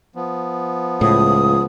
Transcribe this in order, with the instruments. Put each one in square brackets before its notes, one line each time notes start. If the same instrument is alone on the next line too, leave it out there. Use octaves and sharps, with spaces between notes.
[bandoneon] F3 B3
[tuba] C#2 [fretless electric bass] A2 [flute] D#6